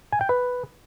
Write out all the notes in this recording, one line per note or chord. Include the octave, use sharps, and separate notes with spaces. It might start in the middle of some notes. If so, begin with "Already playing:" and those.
G#5
G5
B4